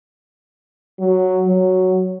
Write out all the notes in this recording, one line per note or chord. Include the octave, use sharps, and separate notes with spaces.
F#3
F#3